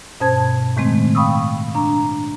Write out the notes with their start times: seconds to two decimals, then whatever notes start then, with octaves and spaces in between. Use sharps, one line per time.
0.21 G2 B2 C#4 C5 A5 G#6
0.77 A2 D#3 G#3 A3 C4
1.15 F5 G5 B5 C#6 D#6 E6
1.75 D4 A#5